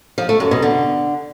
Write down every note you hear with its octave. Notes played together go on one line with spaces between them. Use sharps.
F3
A3
F#2
B2
D3